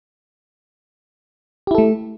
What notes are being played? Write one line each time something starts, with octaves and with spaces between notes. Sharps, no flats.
A3 E4 G4 A4